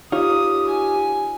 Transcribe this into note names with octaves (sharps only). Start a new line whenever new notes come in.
D#4 F4 G4 C#5 D#6
G#5